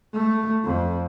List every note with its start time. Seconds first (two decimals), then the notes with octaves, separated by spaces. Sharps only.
0.13 A3
0.64 F2